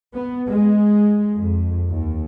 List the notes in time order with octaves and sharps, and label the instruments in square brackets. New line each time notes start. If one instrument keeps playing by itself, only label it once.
[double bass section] B3
G#3
F2
D#2